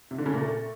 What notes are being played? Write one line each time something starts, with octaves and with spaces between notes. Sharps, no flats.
C3
D3
C#3
A#2
A3